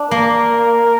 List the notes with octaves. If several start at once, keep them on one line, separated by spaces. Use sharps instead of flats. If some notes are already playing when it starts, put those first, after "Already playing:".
Already playing: D4
A#3 A#4